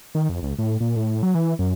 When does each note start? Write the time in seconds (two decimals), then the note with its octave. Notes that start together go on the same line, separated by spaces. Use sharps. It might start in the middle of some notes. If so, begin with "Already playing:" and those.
0.15 D#3
0.29 F2
0.43 C#2
0.59 A2
0.80 A#2
0.96 A2
1.23 F#3
1.35 E3
1.59 F#2